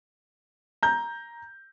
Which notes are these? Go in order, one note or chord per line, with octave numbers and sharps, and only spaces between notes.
A#5 G6